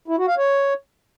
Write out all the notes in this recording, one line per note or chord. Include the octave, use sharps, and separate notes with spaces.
E4
F#4
F5
C#5